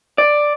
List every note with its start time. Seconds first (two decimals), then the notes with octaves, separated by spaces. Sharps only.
0.18 D5